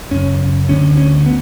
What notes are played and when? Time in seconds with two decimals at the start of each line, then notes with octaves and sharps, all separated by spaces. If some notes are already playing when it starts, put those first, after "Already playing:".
0.11 F#2 C#3 C#4
0.69 D2 D3 C#4
0.97 C#4
1.26 B3